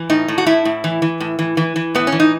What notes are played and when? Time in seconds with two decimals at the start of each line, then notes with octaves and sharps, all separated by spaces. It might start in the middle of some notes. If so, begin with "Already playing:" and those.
Already playing: E3
0.10 A2 D#4
0.28 A2
0.38 F#4
0.46 A2 E4
0.65 A2
0.84 E3
1.02 E3
1.21 A2
1.39 E3
1.57 E3
1.76 E3
1.95 A2 B3
2.07 C#4
2.12 E3
2.20 D#4